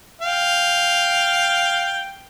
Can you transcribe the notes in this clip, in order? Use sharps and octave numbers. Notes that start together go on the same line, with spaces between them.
F5 G5